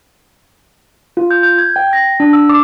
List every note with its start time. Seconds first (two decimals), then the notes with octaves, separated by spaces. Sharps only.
1.17 F4
1.31 G6
1.43 G6
1.58 G#6
1.76 G5
1.93 A#6
2.20 D4
2.33 E6
2.49 D6